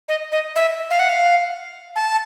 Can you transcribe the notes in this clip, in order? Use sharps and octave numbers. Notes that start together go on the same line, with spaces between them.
D#5
D#5
E5
F5
F#5
F5
A5